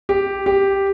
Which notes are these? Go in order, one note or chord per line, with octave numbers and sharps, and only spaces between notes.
G4
G4